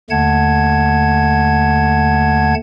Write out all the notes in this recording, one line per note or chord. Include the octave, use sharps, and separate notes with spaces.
D#2 D3 A3 F#5 A5 G#6